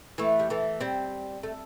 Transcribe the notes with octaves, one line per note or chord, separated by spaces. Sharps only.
E3 A3
G3
E3 A3
G3 C4
A3